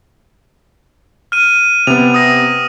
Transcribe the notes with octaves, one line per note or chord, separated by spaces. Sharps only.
F6 D#7
C3 B3 F7
D#6 A#6